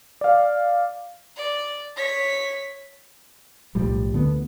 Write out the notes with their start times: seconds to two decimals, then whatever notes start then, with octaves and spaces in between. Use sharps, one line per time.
0.21 D5 F5
1.37 D5
1.97 C#5 B6
3.75 B1 A2 F3 G3
4.13 D2 D3 B3